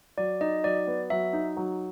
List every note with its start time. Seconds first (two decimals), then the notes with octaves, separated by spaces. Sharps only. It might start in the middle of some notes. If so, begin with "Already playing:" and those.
0.17 F#3 D5
0.41 D#4 D#5
0.64 F#3 D5
0.87 B3
1.10 F#3 E5
1.33 D#4
1.57 F#3